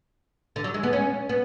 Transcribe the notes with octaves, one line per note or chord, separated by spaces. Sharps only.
D3
F#3
G#3
B3
C#4
B3